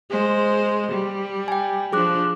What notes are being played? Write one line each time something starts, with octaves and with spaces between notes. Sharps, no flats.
G#3 C5
G3
G5 G#5
F3 D4 G#4 D6 F#6